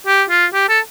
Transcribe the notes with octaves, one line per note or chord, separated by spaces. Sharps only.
G4
F4
G4
A4